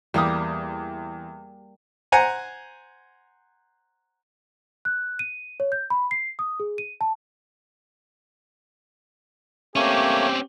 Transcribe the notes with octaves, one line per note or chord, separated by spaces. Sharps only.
E2 G3 A#3 G4 D#6
C5 F#5 G#5 A#5
F#6
D#7
C#5
G6
B5
C7
D#6
G#4
D#7
A5
A3 A#3 C4 C#4 G4 C#5